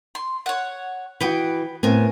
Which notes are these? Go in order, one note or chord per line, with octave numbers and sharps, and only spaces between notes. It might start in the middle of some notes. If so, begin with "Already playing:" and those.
C6
C#5 F#5
E3 F#4 B4 G5 D#6
A2 B3 C4 A#4 G#5